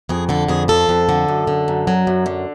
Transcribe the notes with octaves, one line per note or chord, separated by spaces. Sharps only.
F2 G#4
D3 A4
F2 G#4
F3 A4
F2
D3
F#2
D3
F#2
F#3
F#2
D3